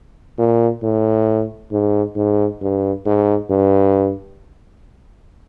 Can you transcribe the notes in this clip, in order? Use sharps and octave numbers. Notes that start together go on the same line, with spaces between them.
A#2
A2
G#2
G#2
G2
G#2
G2